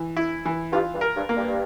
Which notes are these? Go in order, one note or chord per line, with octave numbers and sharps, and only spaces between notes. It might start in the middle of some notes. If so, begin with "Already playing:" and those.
Already playing: E3
E4
E3
G2 F4
G2
A#4
G2
A#3
G2